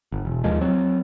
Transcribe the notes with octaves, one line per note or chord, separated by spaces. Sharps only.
G1
E1
D#2 D#3 F3 G#3
F#3 C4